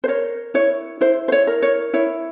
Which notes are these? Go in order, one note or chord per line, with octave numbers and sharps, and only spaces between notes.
C5
A#4 C#5
E4 C#5
E4 C5
C5
C#5
A#4
C#5
E4 C#5